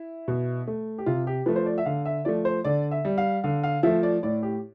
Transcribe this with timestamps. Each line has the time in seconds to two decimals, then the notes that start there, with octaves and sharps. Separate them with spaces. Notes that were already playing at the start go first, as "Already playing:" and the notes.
Already playing: E4
0.28 B2
0.67 A3
0.98 G4
1.06 C3 F4
1.27 G4
1.46 F3 A3 B4
1.56 C5
1.66 D5
1.78 E5
1.86 D3 F5
2.06 E5
2.25 F3 A3 D5
2.45 C5
2.64 D3 D5
2.91 E5
3.05 G3
3.18 F5
3.44 D3 F5
3.63 F5
3.83 F3 A3 E5
4.03 D5
4.23 A2 D5
4.43 G4